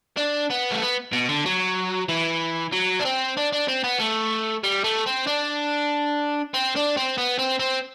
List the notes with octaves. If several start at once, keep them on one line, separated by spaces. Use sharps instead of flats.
D4
B3
A3
B3
B2
D3
F#3
E3
F#3
D4
C4
D4
D4
C4
B3
A3
G3
A3
C4
D4
C4
D4
C4
B3
C4
C4